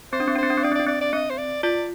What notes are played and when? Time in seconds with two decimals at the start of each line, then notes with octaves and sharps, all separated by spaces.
0.13 C4 C5
0.20 D4
0.28 C4
0.35 D4
0.38 C5
0.43 C4
0.50 D4
0.58 C4
0.63 D4 D5
0.72 C4
0.75 D5
0.80 D4
0.87 C4 D5
1.01 D5
1.13 C4 D#5
1.30 C5
1.38 D5
1.63 F4 D5